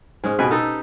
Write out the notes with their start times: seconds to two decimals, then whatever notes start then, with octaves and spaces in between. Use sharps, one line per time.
0.24 G#2 G#3 C#4
0.39 B2 G4 B4 G#5
0.51 D#4 A4